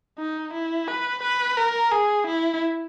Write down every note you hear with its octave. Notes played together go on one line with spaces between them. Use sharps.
D#4
E4
B4
B4
A#4
G#4
E4